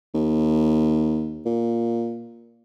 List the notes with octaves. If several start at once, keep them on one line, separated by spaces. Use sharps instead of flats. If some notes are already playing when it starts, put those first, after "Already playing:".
D#2
A#2